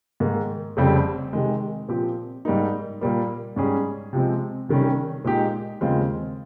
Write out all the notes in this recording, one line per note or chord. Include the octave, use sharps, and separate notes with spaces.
G#2 D#3 A#3
F1 F2 C#3 G3 C4
C3 D#3 G#3
A#2 F3 C4 G4
G#2 G3 A#3 D#4
A#2 G3 A#3
G#2 G3 C#4 G#4
C3 F3 G#3 C4
C3 D#3 G3 C#4
A#2 G#3 D#4 G4
D#2 C#3 G#3 C4 F4